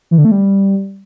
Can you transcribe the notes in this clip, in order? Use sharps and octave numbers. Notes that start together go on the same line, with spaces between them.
E3
D3
A3
G3